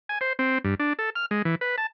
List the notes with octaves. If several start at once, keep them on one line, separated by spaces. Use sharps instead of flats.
G#5
C5
C4
G2
D4
A4
F6
G#3
E3
B4
A5